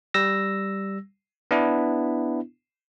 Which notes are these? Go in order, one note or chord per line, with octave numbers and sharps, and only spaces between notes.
G3 E6 A#6
B3 D4 E4